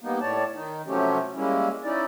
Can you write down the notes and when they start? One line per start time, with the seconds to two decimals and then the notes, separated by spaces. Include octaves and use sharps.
0.01 G3 A#3 B3 D#4
0.21 A2 C#5 D5 A5
0.54 D#3 D#4
0.86 C3 F3 F#3 A3 C#4 G4
1.35 G3 G#3 A#3 C#4 E4
1.84 C#4 D#4 E4 D5